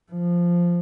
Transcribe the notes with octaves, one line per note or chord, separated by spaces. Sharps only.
F3